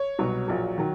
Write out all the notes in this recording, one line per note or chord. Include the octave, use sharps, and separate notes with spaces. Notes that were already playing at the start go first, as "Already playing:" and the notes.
Already playing: C#5
C2 B2 F#3
A#1 A#2 F#3
D#3 F#3